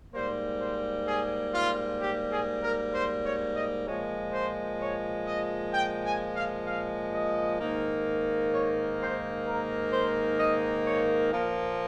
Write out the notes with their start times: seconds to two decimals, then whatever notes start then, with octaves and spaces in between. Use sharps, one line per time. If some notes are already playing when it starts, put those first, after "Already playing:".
0.13 G#2 G3 A#3 C5
0.60 C5
1.07 G#4
1.53 F4
2.00 G4
2.31 G#4
2.63 A#4
2.93 C5
3.25 C#5
3.56 D#5
3.87 A#2 F3 G#3 C#5
4.33 C5
4.80 C#5
5.26 D#5
5.73 G5
6.04 G#5
6.35 F5
6.66 F5
7.13 D#5
7.59 G#2 D#3 A#3
8.53 C#5
9.00 C5
9.46 A#4
9.92 C5
10.39 D#5
10.86 C#5
11.32 A#2 F3 A#3 A#4